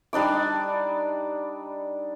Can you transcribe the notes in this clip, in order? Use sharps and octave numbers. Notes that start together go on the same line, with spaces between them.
G3 D4 D#4 D6